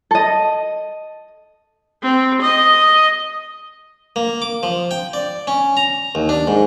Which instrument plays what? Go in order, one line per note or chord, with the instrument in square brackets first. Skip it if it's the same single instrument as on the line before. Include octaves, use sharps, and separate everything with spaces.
[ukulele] A4 D#5
[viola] C4
D#5
[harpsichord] A#3
D6
F3
G5
D5
C#4
A#5
D#2
D4
G#2